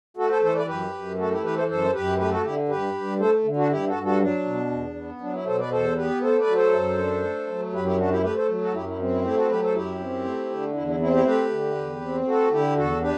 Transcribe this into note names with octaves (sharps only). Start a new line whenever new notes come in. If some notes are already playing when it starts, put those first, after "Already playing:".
A3 F#4 A4
A4 C5
E3 A4 C5
B4 D5
F#2 G4 B4
F#2
A3 F#4 A4
E4 G4
E3 G4 B4
A4 C5
F#2 A4 C5
F#2 G4 B4
A3 G4 B4
F#4 A4
D3 E4 G4
G2 G4 B4
G2
A3 A4 C5
D3
D4 F#4
G2 E4 G4
F#4 A4
G2
F#4 A4
F#3 D4
B2
E2
B3
F#3 D4
E4
B2 A4 C5
B4 D5
E2 A4 C5
B3 G4 B4
A3 A4 C5
B4 D5
F#3
A4 C5
F#2
D4
A3
F#3
F#2 G4 B4
E4 G4
D4 F#4
E4 G4
A3 G4 B4
A4 C5
F#3
F#4 A4
F#2 E4 G4
E4
C4
E4
A3 E4 G4
F#4 A4
F#3 G4 B4
A4 C5
F#2 E4 G4
C4
A3
D3
E2 E4
E4
C4 E4
E4 G4
A3 G4 B4
D3
E2
C4
A3 F#4 A4
D3 E4 G4
E2 F#4 A4
D4 G4 B4